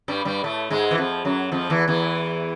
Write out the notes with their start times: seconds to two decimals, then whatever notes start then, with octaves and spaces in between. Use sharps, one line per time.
0.08 G2 G3
0.25 G2 G3
0.44 A2 A3
0.70 G#2 G#3
0.91 E3
0.98 F2 F3
1.25 F#2 F#3
1.52 F2 F3
1.70 E2 E3
1.88 E2 E3